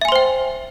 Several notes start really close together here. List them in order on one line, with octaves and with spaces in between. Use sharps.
E5 G#5 C6 C5 G5